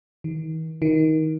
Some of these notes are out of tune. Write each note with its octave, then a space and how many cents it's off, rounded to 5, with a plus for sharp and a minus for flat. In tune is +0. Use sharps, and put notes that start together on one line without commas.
D#3 +40
D#3 +20